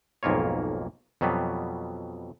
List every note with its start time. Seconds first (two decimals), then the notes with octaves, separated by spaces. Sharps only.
0.23 B1 F2 G#2 A#3 F4 C#5
1.21 F2 B2 F#3 G3 B3